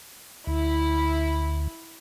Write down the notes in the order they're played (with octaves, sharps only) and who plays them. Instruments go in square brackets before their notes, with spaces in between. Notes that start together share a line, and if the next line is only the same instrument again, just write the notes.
[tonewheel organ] D2 [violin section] E4